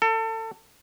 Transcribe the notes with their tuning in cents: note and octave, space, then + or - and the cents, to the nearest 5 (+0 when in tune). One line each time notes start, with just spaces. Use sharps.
A4 +30